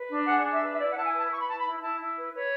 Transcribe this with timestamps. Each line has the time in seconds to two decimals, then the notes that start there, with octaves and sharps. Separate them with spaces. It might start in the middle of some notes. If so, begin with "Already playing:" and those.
Already playing: B4
0.10 D4
0.26 G#4 F#5
0.43 D4
0.53 E5
0.61 B4
0.73 E5
0.78 E4 D5
0.91 F#5
0.95 E4 A5
1.05 G#5
1.13 B4 A5
1.29 B4 C#6
1.40 B5
1.48 E4 A5
1.58 B5
1.65 E4
1.76 B5
1.81 E4 A5
1.99 E4
2.16 B4
2.33 B4 C#5